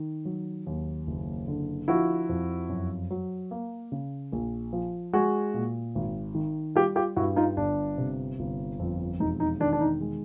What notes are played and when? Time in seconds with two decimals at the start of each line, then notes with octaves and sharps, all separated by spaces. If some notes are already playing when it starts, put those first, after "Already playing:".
Already playing: D#3
0.25 F#3
0.66 D#2
1.07 F#1
1.48 D3
1.88 F3 E4 F#4
2.29 F2
2.69 F#2
3.11 F#3
3.51 A#3
3.92 C#3
4.32 A#1
4.73 F3
5.13 G#3 F#4 G#4
5.54 A#2
5.95 G#1
6.35 D#3
6.75 G3 F4 G4
6.96 F4 G4
7.16 G2 E4 F#4
7.36 D#4 F4
7.57 G1 D4
7.98 C3
8.39 G1
8.80 F2
9.20 E1 D#4
9.40 D#4
9.60 D#3 D4
9.73 D4
9.81 D#4
10.01 G#3